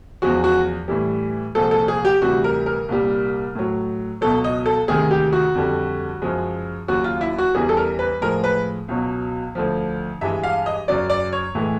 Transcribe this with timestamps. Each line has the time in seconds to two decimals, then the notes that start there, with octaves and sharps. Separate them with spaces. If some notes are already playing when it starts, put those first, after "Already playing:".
0.22 E2 C#3 F3 G#3 F#4
0.44 F#4
0.88 A2 E3 G3
1.55 C2 A#2 F3 G#3 A4
1.71 A4
1.88 G#4
2.05 G4
2.22 D2 C3 E3 G3 F#4
2.44 A#4
2.66 A#4
2.88 C2 A#2 G3
3.55 A2 F#3
4.21 C#2 B2 F#3 A4
4.44 D#5
4.66 A4
4.88 D2 C3 D#3 G#3 G#4
5.11 G4
5.32 F#4
5.55 F2 D3 G3
6.22 F#2 C#3 F3 G#3
6.88 D#2 C#3 F#3 F#4
7.04 F4
7.21 E4
7.38 F#4
7.55 E2 C#3 E3 G3 G#4
7.69 A4
7.77 A#4
7.99 B4
8.21 A2 F3 G#3 A#4
8.44 B4
8.88 C#2 B2 F#3
9.55 D2 D3 F3
10.21 G2 E3 G#3 E5
10.43 F5
10.66 D#5
10.88 F#2 C#3 F#3 D5
11.10 D5
11.33 C#5
11.55 A2 E3 G#3